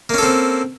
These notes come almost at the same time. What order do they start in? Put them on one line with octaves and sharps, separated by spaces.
A#3 C#4 A4 C4